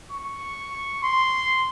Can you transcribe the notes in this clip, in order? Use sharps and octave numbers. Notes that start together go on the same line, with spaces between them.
C#6
C6